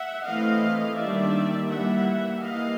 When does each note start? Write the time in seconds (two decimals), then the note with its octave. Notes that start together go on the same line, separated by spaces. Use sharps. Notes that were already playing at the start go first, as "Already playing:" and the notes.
Already playing: E5 F#5
0.25 E3 A3 C4 E4 D#5 F5
0.98 D#3 G3 A#3 D4 D5 E5
1.69 E3 G3 A#3 E5 F#5
2.41 E3 G3 A#3 D#5 F5